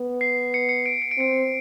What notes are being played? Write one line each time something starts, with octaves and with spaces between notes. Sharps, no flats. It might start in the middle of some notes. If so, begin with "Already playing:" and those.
Already playing: B3
C7
C#7
C#7
D7
C#7
D7
C4 C#7